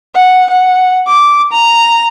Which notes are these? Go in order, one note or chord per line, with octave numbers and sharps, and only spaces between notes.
F#5
F#5
D6
A#5